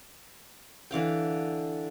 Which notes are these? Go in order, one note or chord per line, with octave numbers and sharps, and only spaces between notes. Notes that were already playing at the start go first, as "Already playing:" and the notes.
D3 E3 F5 G5